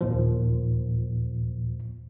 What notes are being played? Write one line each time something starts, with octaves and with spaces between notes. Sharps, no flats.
D#2 A#2 F3